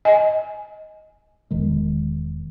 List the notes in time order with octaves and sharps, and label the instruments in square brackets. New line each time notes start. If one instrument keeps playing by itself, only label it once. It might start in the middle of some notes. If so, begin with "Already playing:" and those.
[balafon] D#5 G#5
[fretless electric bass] E1 D#3 G#3